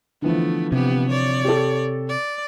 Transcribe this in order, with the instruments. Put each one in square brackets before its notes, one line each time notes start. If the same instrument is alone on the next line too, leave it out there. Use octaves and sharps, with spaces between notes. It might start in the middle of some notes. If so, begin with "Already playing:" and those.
[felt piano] D3 E3 F3 [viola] A3 B3
[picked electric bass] C3 [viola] B3 G4
[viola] C#5 D5
[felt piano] G4 A4
[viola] D5